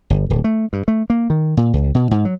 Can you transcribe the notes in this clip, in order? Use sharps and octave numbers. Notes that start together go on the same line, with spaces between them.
G1
D1
A3
G2
A3
A#3
D#3
A#2
C#2
B2
G#2
F#3